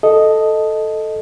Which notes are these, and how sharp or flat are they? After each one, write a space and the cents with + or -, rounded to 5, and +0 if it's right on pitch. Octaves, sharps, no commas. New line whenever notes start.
A4 +0 D#5 +0